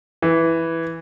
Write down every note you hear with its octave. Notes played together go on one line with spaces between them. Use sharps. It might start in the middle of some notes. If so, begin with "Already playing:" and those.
E3